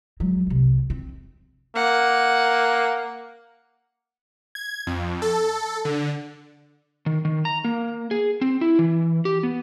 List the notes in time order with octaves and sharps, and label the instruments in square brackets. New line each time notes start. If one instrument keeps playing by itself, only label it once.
[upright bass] F#3 G#3
C2 C3
C4
[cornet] A#3 [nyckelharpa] F#5
[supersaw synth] G#6
F2
A4
D3
[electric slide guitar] D#3
D#3
A#5
A#3
G#4
C4
E4
E3
G4
B3